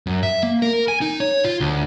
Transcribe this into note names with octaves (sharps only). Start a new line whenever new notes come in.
F#2
E5
A#3
A#4
G#5
D#4
C#5
F4
D2